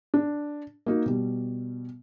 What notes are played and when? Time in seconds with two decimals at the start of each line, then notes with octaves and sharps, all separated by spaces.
0.14 D4
0.86 A#3 D#4 F#4
1.06 B2 G3